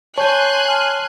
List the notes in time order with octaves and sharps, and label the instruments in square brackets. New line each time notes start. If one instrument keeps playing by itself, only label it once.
[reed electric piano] C#5 [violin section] G#5 C6 F#6 [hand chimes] A5 G6
[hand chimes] A5 F6